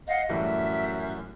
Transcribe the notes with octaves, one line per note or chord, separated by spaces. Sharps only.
D#5 F5 F#5
F#2 A2 E3 G3 E5